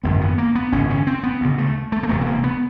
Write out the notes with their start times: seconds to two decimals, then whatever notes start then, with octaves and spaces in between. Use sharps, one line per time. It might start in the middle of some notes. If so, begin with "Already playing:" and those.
0.03 G#1 F#2 D3 B3
0.21 B3
0.38 A#3
0.55 B3
0.72 G#1 F#2 C#3 C#4
0.90 C#4
1.07 C4
1.23 B3
1.41 D2 C#3
1.58 A3
1.92 A3
2.03 A#3
2.09 E1 D2 C3 A3
2.21 B3
2.26 A#3
2.44 B3